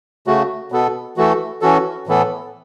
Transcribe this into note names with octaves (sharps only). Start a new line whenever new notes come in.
C#3 A3 F#4
B2 B3 A4
E3 A3 F#4 A4
E3 C#4 F#4 A4
A2 E3 B3 A4